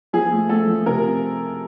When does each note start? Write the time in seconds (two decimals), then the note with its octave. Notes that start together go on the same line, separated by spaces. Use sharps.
0.13 F3 G#4
0.32 A3
0.49 A3 A4
0.67 F3
0.86 C3 A#4